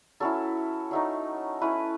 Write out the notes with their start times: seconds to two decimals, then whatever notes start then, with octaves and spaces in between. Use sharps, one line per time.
0.20 F#3 C#4 E4 A4
0.91 F#3 A3 D#4
1.61 A3 C#4 E4 B4